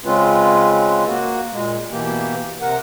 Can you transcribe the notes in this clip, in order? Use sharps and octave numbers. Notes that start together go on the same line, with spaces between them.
C#3 G#3 C4 C#4 F4 B4
A#3 F#4
A#2 G#3
B2 E3 A#3 G4
C3 A#4 F#5